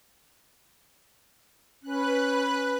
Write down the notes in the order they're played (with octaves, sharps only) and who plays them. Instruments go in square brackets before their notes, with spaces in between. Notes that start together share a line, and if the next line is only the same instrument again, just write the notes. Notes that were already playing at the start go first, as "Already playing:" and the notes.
[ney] C#4 [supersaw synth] B4 F#6